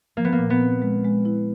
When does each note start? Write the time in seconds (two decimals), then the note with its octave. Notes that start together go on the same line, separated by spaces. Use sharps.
0.17 F3 A#3
0.25 B3
0.32 A#3
0.39 A#2
0.50 B3
0.60 C4
0.82 G#3
1.05 G#3
1.25 E4